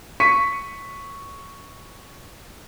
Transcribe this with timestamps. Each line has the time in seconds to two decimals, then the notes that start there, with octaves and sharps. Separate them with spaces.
0.20 C#6 B6 C#7 D#7